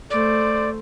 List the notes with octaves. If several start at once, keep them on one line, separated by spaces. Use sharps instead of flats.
A3 C5 D5